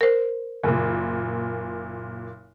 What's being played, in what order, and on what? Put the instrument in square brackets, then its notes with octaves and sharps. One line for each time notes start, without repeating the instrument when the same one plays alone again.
[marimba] A#4 C5
[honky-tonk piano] F#1 A#2